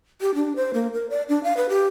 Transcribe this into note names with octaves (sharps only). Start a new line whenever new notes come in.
G4
D4
C5
A#3
A#4
D5
D4
F5
B4
G4